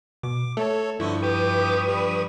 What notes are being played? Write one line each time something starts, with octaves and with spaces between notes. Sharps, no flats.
B2 D6
A3 A4 C#5 A5
G2 D3 F3 E4 C#6
G4 B4 D#6
G3